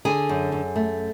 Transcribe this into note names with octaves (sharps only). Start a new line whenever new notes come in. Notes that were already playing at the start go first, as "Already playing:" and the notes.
D3 G#4 G#5
F#2
F#2
A3